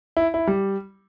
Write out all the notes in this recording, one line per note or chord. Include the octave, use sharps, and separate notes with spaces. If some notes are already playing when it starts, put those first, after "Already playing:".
E4
E4
G3